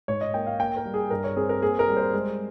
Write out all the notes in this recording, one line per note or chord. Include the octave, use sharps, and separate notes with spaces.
G#2 C#5
D#5
A#3 G5
F5
A#3 G5
A#4
G3
G#4
G2 A#4
C#5
C4 G#4
A#4
A#3 G#4
A#4
G3
C5
G#3